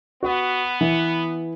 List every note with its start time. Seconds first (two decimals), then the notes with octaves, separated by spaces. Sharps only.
0.23 B3 F#4
0.81 E3 B4